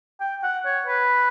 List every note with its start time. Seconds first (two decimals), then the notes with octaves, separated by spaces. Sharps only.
0.20 G5
0.43 F#5
0.65 C#5
0.86 B4